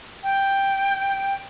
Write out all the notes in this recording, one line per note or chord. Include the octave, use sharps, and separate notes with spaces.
G5